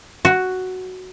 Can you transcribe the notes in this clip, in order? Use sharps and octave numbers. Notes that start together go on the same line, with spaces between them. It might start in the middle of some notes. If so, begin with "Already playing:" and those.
F#4